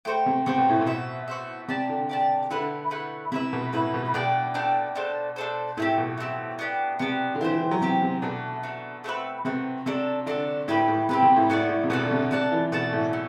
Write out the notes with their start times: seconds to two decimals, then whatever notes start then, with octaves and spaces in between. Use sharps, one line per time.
0.05 A3 F#4 C5 G5
0.26 C3
0.46 C3 F#4 C5 G5
0.58 B2
0.69 A2
0.81 B2
0.86 F#4 C5 E5
1.28 F#4 C5 E5
1.68 C3 G4 D5 A5
1.89 D3
2.09 G4 D5 A5
2.50 D3 A3 E4 B4 F#5
2.91 A3 E4 B4 F#5
3.32 C3 E4 B4 E5
3.53 B2
3.73 A2 E4 B4 E5
3.94 B2
4.14 B2 D4 A4 D5 G5
4.54 D4 A4 D5 G5
4.96 D4 A4 C5
5.36 D4 A4 C5
5.77 A2 A3 C4 G4
5.98 B2
6.18 A3 C4 G4
6.59 B3 D4 G4
6.99 C3 B3 D4 G4
7.35 D3
7.41 E3 C4 G4 C5
7.51 E3
7.61 E3
7.71 F#3
7.81 C3 C4 G4 C5
8.02 C3
8.22 B2 A3 D4 F#4
8.63 A3 D4 F#4
9.04 A3 C4 F#4 B4
9.45 C3 A3 C4 F#4 B4
9.86 C3 D4 F#4 A4
10.26 D3 D4 F#4 A4
10.68 A2 C4 G4 B4
10.88 A2
11.09 C3 C4 G4 B4
11.22 C3
11.36 A2
11.50 A2 B3 F#4 A4 D5
11.69 A2
11.84 C3
11.90 B2 B3 F#4 A4 D5
12.05 D3
12.11 C3
12.31 C3 F#4 A4 D5 A5
12.52 E3
12.72 B2 F#4 A4 D5 A5
12.93 A2
13.13 A3